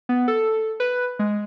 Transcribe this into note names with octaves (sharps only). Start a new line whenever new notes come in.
B3
A4
B4
G#3